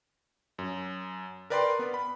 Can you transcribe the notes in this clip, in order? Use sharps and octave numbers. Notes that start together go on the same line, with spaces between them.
F#2
A#4 B4 D5 G5 B5 C6
B3
B5